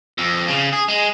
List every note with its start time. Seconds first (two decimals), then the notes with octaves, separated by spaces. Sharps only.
0.18 F2
0.48 C#3
0.73 G#4
0.88 G#3